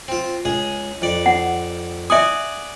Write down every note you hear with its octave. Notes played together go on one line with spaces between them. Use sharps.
C4 F4
C#2 G#4 D#6
F2 D5
F#5
D5 E5 F#5 G#5 D#6